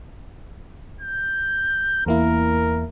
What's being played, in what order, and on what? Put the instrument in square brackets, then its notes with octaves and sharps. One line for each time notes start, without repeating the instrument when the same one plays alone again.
[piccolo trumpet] G6
[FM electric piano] E2 A#3 E4 [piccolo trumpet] A#4